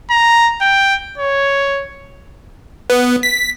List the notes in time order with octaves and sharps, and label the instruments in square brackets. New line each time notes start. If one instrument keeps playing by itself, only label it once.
[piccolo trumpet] A#5
G5
C#5
[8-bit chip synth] B3
B6